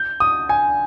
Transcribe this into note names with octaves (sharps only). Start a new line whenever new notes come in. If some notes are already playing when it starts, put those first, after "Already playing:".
Already playing: G6
D#6
G#5